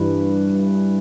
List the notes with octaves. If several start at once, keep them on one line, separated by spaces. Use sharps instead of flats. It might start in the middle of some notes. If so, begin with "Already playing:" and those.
Already playing: G2 E3 B4